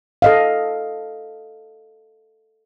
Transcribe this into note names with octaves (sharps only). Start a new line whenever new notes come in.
A4 D#5 F5